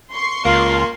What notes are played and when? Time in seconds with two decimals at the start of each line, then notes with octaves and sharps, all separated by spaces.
0.11 C6 C#6 C7
0.45 C#2 A#3 F4